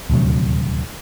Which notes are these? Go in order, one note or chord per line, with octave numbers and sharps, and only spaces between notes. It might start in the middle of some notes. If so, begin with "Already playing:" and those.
D#1 D2 C3 F#3